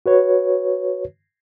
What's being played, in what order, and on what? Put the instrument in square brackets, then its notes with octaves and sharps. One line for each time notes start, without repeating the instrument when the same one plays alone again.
[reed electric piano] F#4 B4 C#5